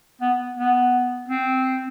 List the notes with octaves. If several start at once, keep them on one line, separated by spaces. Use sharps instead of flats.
B3
B3
C4